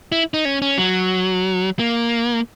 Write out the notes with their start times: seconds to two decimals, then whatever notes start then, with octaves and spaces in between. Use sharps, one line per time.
0.12 E4
0.34 D#4
0.45 C#4
0.62 C#4
0.78 F#3
1.79 A#3